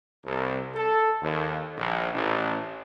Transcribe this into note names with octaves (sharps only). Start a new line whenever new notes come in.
C2
A4
D#2
A#1
A1